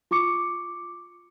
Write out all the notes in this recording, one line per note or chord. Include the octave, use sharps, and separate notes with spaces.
F4 C#6 D6 C#7